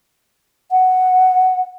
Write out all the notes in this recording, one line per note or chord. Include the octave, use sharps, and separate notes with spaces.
F#5